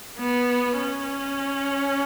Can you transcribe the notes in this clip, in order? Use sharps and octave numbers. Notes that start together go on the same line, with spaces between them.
B3
C#4